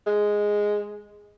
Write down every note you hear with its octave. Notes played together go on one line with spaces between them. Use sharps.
G#3